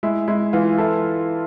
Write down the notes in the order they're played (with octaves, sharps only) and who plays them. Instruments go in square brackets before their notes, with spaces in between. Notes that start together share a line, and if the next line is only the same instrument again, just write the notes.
[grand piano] G#3 [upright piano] E4
[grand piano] G#3 [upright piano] E4
[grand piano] E3 [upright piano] F4
[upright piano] E4 [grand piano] A4